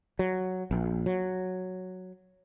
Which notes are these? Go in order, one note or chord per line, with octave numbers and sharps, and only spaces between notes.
F#3
A#1
F#3